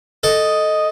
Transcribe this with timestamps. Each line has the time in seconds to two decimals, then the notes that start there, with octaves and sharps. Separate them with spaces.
0.23 A4 D#5